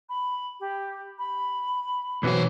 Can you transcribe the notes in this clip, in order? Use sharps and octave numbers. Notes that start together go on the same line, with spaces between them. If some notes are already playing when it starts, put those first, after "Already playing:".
B5
G4
B5
B1 E3 F#3 C5